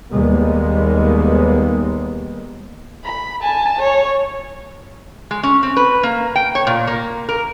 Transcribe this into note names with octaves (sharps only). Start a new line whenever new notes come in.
D#2 G3 G#3 A#3 B3
B5
G#5 A5
C#5
G#3
C#4
C4
B4
A#3
G5
C#5
A#2
A#3
A#4